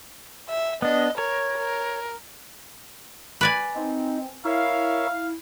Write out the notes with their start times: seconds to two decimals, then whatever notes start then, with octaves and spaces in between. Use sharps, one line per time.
0.49 E5
0.82 B3 D4 D#5
1.18 A#4 C#5
1.58 A#4
3.41 B4 D5 G#5
3.76 C4 D#4
4.45 E4 A#4 C#5 E5 F5